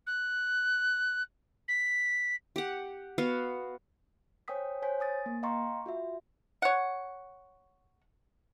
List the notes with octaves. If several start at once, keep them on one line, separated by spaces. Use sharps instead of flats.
F#6
B6
G4 F#5
B3 F#4 F5
C5 C#5 G5 G#5 D#6 B6
C5 C#5 G#5 G6 B6
G#5 D#6 A6
A#3
D#5 F5 G5 A#5 C6 C#6
F4 F#4 E5
C#5 F#5